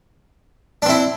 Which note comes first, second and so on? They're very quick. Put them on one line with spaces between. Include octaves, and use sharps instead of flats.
D4 C4 E4